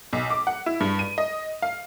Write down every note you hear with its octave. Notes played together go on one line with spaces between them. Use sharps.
B1
D6
F#5
E4
G2
D#7
D#5
F5